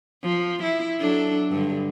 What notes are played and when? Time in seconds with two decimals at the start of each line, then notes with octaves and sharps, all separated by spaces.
0.23 F3
0.63 E4
1.00 F#3 D4 A4
1.50 G2 D3